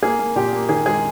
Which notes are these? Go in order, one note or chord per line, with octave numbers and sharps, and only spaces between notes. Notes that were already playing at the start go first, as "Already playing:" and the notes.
A#3 G#4
A#3
A#2 G4
A#3
D#3 G#4
G#3 G#4